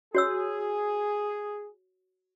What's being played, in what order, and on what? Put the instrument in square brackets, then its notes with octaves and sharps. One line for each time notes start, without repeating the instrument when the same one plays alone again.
[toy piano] F#4 C#5 E6 [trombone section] G#4